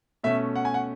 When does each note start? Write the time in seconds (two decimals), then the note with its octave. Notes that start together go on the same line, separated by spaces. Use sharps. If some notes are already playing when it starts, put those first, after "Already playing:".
0.24 B2 A3 C#4 E5
0.55 F#5
0.65 G#5
0.74 F#5